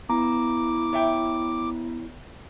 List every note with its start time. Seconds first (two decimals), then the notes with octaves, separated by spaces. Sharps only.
0.09 B3 E4 A#5 D6
0.93 C#5 E5 G5